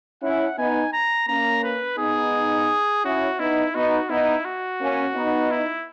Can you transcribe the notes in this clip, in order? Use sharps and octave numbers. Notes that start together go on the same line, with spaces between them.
C#4 E4 F#5
B3 D#4 G#5
A#5
A#3 C#4 A#5
B4
B3 D#4 G#4
C#4 E4 F#4
B3 D#4 E4
B3 D#4 F#4
B3 D#4 E4
F#4
A#3 C#4
B3 D#4
E4